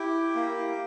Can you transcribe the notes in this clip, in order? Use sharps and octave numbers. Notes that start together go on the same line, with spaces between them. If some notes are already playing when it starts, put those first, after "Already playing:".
Already playing: E4 G4
A#3